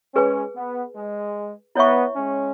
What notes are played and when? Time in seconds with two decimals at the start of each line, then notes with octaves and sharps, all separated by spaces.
0.15 G#3 C#4 G#4 B4 G#5
0.55 B3
0.96 G#3
1.75 B3 E4 C#5 E5 C#6
2.16 G#3 C#4